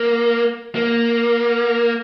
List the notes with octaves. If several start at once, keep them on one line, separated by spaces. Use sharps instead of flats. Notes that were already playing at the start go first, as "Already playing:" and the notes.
Already playing: A#3
A#3